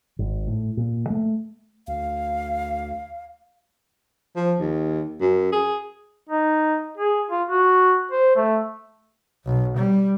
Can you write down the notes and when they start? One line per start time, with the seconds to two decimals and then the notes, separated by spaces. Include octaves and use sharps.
0.19 G#1
0.47 A2
0.77 A#2
1.10 A3
1.88 D2 F5
4.36 F3
4.59 D#2
5.21 F#2
5.52 G#4
6.29 D#4
6.97 G#4
7.31 F4
7.50 F#4
8.12 C5
8.36 A3
9.45 B1
9.77 G3